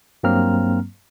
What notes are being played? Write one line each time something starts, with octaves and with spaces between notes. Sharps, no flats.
G2 F#3 A#3 C4 A#5 F6